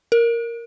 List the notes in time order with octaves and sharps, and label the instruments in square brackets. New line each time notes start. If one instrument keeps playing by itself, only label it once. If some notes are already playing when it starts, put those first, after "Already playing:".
[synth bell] A#4